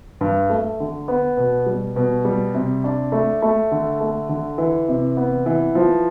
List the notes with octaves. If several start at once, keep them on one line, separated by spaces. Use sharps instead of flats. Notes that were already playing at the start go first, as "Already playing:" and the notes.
G2
A3
D3
B3
B2
G3
B2
G3
C3
D4
A3
A3
D3
A3
D3
E3
C3
B3
E3
F3